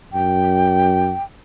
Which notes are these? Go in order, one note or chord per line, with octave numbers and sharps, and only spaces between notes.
F#2 G5